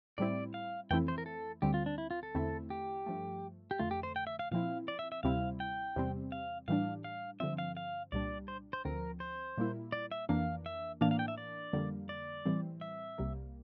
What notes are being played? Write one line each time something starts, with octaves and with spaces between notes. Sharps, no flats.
A2 G3 C4 E4 D5
F5
F2 E3 A3 C4 E4 G5
C5
A#4
A4
D2 D3 G3 C4 G4
F4
D4
E4
F4
A4
E2 D3 A3 C4 E4
G4
G2 F3 A3
G4
F2 D3 A3 F4
G4
C5
G5
E5
F5
A#2 F3 C4 E4 F5
D5
E5
E5
D2 C3 G3 C4 E4 F5
G5
E2 C3 G3 C4
F5
A2 E3 G3 D4 F5
F5
G2 D3 F3 C4 E5
F5
F5
C2 A#2 G3 D4 D5
C5
C5
D2 D3 F3 C4 A#4
C5
A#2 G3 A#3 E4
D5
E5
F2 E3 A#3 D4 F5
E5
A2 E3 A#3 D4 F5
F5
G5
E5
D5
F2 D3 G3 A#3
D5
A2 E3 G3 C4
E5
C2 C3 G3 A#3